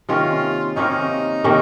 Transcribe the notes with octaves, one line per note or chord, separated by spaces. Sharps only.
C3 D#3 A#3 C#4 F4
C3 D#3 A#3 C#4 D#4
C3 D#3 A#3 C#4